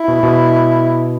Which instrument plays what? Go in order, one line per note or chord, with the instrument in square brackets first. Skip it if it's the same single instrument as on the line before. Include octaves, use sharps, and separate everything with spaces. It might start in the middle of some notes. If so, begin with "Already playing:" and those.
Already playing: [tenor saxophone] E4
[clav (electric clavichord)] B2
B2